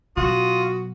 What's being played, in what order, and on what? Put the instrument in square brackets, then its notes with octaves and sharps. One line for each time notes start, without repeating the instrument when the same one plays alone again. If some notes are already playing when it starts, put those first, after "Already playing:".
[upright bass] B2 F#3 [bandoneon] F4 [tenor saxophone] F#4 [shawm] D#6